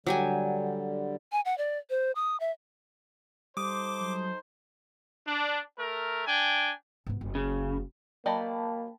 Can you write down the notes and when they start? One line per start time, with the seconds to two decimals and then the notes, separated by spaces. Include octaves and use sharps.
0.07 D3 F#3 G3 G4 G#5
1.32 G#5
1.45 F#5
1.58 D5
1.90 C5
2.15 D#6
2.40 E5
3.57 G3 D#4 A4 C5 D6 D#6
4.00 F#3
5.26 D4
5.78 A3 A#4
6.27 D4 G5 G#5
7.07 G#2 B3
7.21 F#1
7.35 C#3
8.26 F#3 A#3 D5 D#5 G5 A5 B5